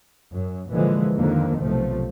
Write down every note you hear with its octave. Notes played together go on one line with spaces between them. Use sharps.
F#2
A#2 D3 E3 F3 G#3
F2 D3 D#3 F3 A#3
B1 C3 F3 A3